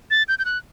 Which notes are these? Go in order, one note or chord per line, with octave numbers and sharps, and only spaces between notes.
A6
G6
G6
F#6